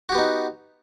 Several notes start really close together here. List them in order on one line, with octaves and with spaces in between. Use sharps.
F#4 G4 B3 D#4